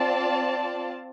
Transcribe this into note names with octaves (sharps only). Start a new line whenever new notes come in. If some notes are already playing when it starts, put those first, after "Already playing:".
Already playing: C4 F4 D5 A5